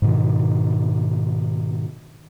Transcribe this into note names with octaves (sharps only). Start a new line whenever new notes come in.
G#2 B2 D#3